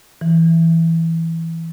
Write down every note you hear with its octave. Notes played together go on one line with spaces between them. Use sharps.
E3